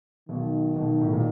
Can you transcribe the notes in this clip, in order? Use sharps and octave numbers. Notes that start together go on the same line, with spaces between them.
B1 B2 D#3
B1 B2
A2
A#2